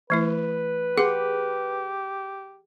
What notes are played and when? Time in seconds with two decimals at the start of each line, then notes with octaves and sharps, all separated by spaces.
0.10 E3 A3 E4 B4
0.98 G4 G#4 F#5 C6